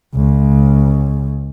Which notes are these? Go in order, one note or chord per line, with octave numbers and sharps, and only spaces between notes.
C#2